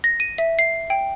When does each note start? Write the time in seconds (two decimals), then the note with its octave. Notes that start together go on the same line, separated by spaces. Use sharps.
0.04 A#6
0.20 D#7
0.38 E5
0.59 C7
0.90 G5